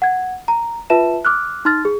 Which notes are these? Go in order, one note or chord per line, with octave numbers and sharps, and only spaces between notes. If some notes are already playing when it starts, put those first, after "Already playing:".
F#5 G#6
A#5
F4 B4 E5 A5 E7
D6 F6 F#6
D#4 C6 F6 A6
G#4